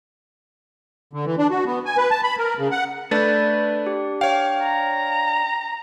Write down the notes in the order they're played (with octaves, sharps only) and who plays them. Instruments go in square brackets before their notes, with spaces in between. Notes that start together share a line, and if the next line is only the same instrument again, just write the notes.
[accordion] D3
E3
D4
F#4
B3
G#5
B4
A5
B5
A#4
C#3
F#5
[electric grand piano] A3 B4 [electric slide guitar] D4 [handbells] B5 G6 A6
[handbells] G4
[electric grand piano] C#5 F5 [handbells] G5
[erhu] A#5